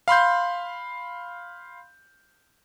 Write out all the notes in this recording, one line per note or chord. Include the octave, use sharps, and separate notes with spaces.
F5 B5 C6 G6